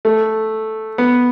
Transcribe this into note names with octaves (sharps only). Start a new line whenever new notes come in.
A3
B3